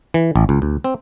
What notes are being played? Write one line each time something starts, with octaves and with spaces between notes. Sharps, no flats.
E3
A1
C#2
D2
C4